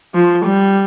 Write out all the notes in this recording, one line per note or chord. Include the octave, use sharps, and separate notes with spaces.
F3
G3